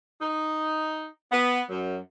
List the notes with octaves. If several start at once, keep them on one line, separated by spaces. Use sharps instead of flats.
D#4
B3
F#2